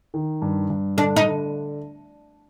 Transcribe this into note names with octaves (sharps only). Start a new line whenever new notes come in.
D#3
G2
G2
D3 D4
D#4
D3